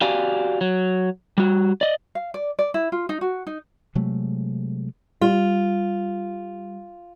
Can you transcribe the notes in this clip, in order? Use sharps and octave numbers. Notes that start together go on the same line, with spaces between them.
F#4 G4 D5 F5 G#5
F#3
G3 F#4
D5 D#5
F5
D5
D5
E4
F4
D#4
F#4
D#4
C3 F#3 G#3 A3
G3 F4